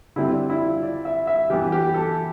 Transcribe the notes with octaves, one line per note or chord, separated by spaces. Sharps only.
D3 G3 C4 E4
D4
E4
F4
D5
E5
E5
E3 B3 G4
G4
A4